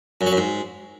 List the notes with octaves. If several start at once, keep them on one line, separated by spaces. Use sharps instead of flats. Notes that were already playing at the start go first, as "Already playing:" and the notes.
F#2
F#3
F#2
G#2